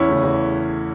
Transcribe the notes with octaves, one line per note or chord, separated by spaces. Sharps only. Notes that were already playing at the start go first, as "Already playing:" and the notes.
Already playing: E2 C#4 E4
C#3 E3 A3
E2